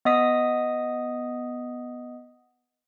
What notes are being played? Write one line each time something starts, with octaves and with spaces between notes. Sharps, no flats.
B3 D#5 D#6 B6